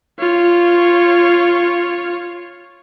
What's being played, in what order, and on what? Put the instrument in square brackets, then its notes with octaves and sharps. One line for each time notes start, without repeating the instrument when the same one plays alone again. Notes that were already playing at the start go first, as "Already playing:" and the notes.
[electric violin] F4 C#5